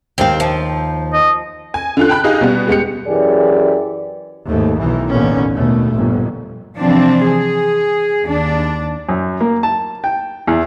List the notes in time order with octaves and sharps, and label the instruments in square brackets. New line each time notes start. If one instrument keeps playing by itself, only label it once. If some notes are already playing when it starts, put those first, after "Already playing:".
[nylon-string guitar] D#2 F5 [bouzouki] C4
[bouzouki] F3
[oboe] D#5
[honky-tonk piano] G#5
D3 F4 F#6
G5 A5 B5 F#6
D#4 G4 G#4 D#5 F5
B2 G3 B3
G#3 B3 G4 C#7
[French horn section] F#2 E3 G4 G#4 D5
[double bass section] D#2 G#2 A3
B1 D#3 E3
A1 D#2 B2 D3 B3 C#4
D#2 B2 A3
G1 F2 A#2
[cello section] C3 E3 F3 C4 D4
G#4
D#2 D4
[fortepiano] F#2
A#3
A5
G5
E2